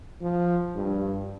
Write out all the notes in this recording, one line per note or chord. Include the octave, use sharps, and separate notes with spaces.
F3
G2